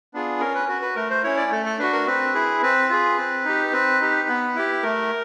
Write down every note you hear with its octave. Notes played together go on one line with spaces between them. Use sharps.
B3 D4 F4 G#4
C#4 A#4
B4
F#4 B4
B4
A3 A#4
C5
C#4 E4 C#5
D5
A3 A4
A4
D4 F#4 B4
A#4
C4 B4
E4 G#4
C4 B4
F4 G#4
C4
D#4 G4
C4 B4
D#4 G4
B3
E4 G4
A3 A#4